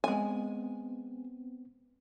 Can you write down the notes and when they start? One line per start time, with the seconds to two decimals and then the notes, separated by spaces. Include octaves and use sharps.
0.04 G#3 B3 C4 G#5